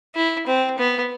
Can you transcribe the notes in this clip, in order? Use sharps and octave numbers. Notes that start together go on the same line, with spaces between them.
E4
C4
B3